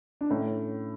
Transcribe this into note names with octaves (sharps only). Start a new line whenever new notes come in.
D4
A2 C#4